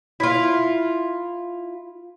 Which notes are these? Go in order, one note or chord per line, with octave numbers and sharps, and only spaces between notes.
E4 F4